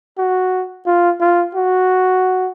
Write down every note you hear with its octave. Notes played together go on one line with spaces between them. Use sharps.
F#4
F4
F4
F#4